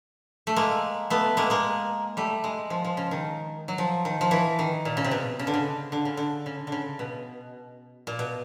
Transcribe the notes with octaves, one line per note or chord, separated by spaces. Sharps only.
A3
G#3 A#3
A3 B3
G#3 A#3
G#3 A#3
G3 A3
G#3
F3
F3
C#3
D#3
F#3
F3
D#3
F3
E3
D#3
A#2
C#3
C3
B2
C#3
D3
C#3
D3
C#3
D3
C#3
D3
C#3
B2
A#2
B2